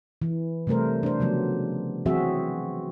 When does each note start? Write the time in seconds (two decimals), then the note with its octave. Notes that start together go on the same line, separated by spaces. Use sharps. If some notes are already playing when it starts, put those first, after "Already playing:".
0.22 E3
0.67 C3 G3 A3 A#4 C5
1.03 D4 C5
1.20 C#3 F3 F#3 A3 B3
2.06 E3 F#3 C4 F#4 G#4 E5